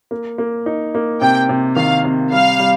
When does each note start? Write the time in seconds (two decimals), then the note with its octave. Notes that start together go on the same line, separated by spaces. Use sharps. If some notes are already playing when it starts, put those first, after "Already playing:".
0.11 A#3
0.38 A#3
0.66 D#4
0.95 A#3
1.21 C3 G5
1.49 C3
1.76 D#3 F5
2.04 C3
2.32 G3 F5
2.60 G3